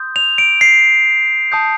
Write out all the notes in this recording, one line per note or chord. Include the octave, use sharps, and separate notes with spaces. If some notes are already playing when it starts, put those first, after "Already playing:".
Already playing: C6 D#6 G6
F7
D7
C7
A5 D#6 G6